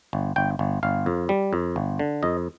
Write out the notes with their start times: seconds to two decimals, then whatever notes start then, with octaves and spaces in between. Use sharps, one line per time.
0.13 G1
0.36 G1 G5
0.59 G1
0.83 G1 F5
1.06 F2
1.29 G3
1.53 F2
1.76 G1
1.99 D3
2.23 F2 D#5